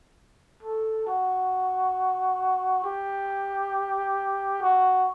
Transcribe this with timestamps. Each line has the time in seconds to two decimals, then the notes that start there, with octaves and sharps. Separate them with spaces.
0.63 A4
1.07 F#4
2.84 G4
4.62 F#4